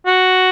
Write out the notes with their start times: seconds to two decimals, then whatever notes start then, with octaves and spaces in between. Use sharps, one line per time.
0.06 F#4